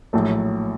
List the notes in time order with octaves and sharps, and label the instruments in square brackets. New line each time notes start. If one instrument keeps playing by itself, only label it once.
[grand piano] A#1 A2 F#3 A3